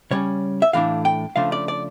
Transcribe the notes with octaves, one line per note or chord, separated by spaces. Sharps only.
C#3 G3 C#4 C#5
E5
A2 E3 A3 D4 F5
G5
C#3 F3 A3 D4 F5
D5
D5